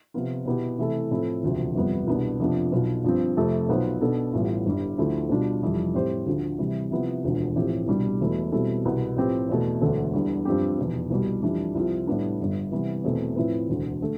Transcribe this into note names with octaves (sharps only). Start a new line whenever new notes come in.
C3 F3 B3 F4
B2 B3 E4 G4
C3 E3 A3 E4 A4
A2 F3 C4 E4 A4
E1 D2 C3 F3
G1 F2 C3 G3 B3
C2 B2 B3 D4
F2 C3 F3 B3 D4
B1 B2 B3 F4 B4
G2 F3 C4
F2 C3 F3 A3
B1 B2 B3 F4 C5
B2 B3 D4 A4
A1 A2 G3 B3 F4
G1 G2 D3 G3
D2 D3 F3 A3 E4
B2 G3 D4 F4
F1 F2 E3 G3
A2 G3 C4 G4 C5
D2 D3 F3
C3 E3 G3
C3 F3 B3 E4
E1 D2 D3 F3
A1 A2 F3 C4 G4
C2 B2 G3 D4
E1 E2 B2 A3 E4
B2 G3 C4 E4 A4
C2 B2 B3
A2 F3 C4 G4 B4
E2 B2 A3
E1 D2 D3 A3 D4
E2 D3 G3
G2 F3 C4 G4
F1 E2 B2
C2 B2 G3
F2 E3 G3 D4
C2 C3 F3 C4 F4
A2 G3 B3 D4
G1 G2 D3
C3 E3 G3 B3
E2 B2 A3 C4
A2 F3 C4 E4 B4
E1 D2 D3
D3 A3